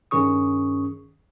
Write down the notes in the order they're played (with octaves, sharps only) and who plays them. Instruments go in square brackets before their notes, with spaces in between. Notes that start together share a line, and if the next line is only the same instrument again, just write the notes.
[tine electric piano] G2 D#3 C#4 G#4 C#6 D#6